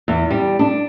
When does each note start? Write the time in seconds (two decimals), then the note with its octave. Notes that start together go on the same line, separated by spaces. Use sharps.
0.08 E2
0.30 G3
0.59 D4